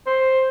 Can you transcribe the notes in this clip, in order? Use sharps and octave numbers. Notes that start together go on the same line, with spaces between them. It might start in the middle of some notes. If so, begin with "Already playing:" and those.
C5